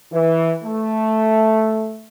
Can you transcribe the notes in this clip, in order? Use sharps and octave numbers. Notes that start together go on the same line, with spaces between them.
E3
A3